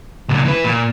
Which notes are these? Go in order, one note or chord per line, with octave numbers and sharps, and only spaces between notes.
C#2 A#2
E3 B4
A#2